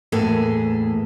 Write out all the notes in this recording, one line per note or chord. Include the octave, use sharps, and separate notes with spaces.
E2 A2 A#3 G#4 A4 B4